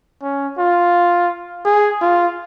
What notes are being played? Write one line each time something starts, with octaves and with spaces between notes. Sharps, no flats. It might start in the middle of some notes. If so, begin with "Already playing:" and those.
C#4
F4
G#4
F4